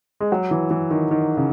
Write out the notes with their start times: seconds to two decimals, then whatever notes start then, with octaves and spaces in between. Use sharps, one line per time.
0.20 G#3
0.32 F#3
0.51 E3
0.71 E3
0.91 D#3
1.11 D#3
1.37 C#3